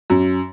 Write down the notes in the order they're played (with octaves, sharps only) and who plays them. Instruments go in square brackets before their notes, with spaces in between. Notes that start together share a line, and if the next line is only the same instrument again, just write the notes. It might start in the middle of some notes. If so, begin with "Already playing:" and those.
[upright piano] F#2